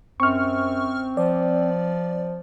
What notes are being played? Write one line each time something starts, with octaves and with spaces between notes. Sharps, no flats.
F#2 C4 C#6 F6
F3 D5